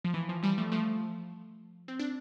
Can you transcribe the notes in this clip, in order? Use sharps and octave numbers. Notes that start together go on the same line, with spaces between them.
F3
E3
F3
E3 G3
F3 A3
F3 A3
C4
D4